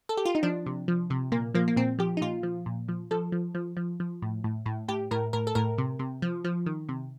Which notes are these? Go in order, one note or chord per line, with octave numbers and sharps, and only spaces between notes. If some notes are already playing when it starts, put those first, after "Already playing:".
A4
G4
F4
D#4
F3 D4
C3
F3
C3
A#2 A#3
F3 A#3
A#3
A#2 C4
F3 G4
D#4
A#2 F4
F3
A#2
F3
F3 A4
F3
F3
F3
F3
A2
A2
A2
A2 G4
A2 A#4
A2 A#4
A4
A2 A#4
C3
C3
F3
F3
D#3
C3